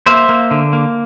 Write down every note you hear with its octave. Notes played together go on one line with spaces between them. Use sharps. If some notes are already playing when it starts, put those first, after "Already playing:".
A#3 C5 E5
A#3
D3
A#3